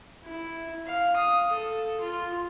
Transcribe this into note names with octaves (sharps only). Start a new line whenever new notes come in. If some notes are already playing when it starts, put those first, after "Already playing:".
E4
F5
D#6
A4
F4